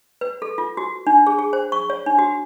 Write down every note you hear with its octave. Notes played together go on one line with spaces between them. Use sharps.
B4
A4
F4
F#4
D4
G#4
G#4
C5
C#6
C#5
D4
F#4